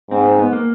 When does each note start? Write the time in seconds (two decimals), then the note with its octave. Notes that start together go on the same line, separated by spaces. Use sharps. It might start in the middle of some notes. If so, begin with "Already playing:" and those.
0.11 G#2 C4
0.26 C4
0.39 B3
0.53 A#3